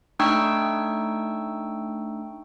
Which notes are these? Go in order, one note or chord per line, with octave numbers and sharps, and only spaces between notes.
A3 D4 D#4 G5 C#6 E6